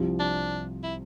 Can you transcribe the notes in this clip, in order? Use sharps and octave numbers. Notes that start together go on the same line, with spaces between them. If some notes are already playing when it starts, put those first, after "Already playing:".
Already playing: C2 C3 F3
D4
E4